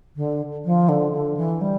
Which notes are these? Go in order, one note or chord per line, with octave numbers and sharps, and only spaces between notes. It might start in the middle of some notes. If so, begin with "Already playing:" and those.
D3
F3
D3
D3
E3
G3